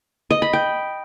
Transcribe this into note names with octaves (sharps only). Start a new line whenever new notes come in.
D#5
B5
G5